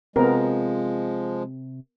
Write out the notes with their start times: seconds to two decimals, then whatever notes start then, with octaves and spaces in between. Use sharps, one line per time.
0.16 C3 F3 G#3 B3 A#4